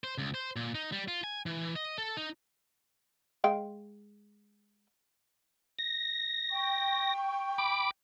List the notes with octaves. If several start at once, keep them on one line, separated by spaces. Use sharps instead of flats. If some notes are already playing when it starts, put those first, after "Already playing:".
C5
C#2
C5
A#2
D#4
G3
F4
G#5
E3
D#5
A4
D#4
G#3 F5 G5
A#6
G5 C#6
B5 D6